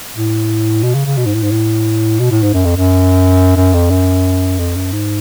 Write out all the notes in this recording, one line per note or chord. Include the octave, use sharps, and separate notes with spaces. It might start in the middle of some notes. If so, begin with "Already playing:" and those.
A2
B2
C#3
C#3
B2
G#2
A2
G#2
A2
B2
A2
G#2
F#2
F2
F#2
F#2
F2
F#2
F2
F#2
G#2